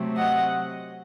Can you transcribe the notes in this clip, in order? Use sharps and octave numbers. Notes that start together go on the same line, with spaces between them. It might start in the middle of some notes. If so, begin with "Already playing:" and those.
Already playing: C3 F#3 A3 C4
D#5 F#5